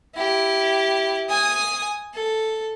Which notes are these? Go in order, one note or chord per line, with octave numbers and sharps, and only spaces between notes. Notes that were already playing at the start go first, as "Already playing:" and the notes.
E4 G4
G#5 D#6
A4